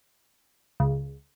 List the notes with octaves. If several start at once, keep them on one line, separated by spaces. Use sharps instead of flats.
C#2